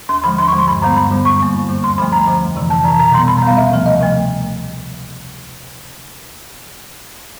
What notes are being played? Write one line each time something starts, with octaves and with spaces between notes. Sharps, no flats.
D#2 C6
D3 F3 G#3 B5
D#2 C6
C#6
D3 F3 G#3
C6
G2 B5
D3 G3 B3 A#5
G2 B5
D3 G3 B3
F#2 C#6
D3 G3 A#3
F#2
D3 G3 A#3
D2 C6
D3 F3 A3 B5
D2 A#5
D3 F3 A3
F2
C3 E3
F2 A5
C3 E3 A#5
B2 A#5
G3 B3 C6
B2 B5
A#5
G3 B3 F5
D2 E5
C3 F3 A3
D2 D#5
C3 F3 A3